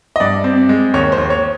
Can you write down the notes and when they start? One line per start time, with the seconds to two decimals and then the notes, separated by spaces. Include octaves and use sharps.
0.16 D#5
0.20 G2 D5
0.44 C4
0.69 G#3
0.94 D#2 C#5
1.12 C5
1.18 D#2
1.30 C#5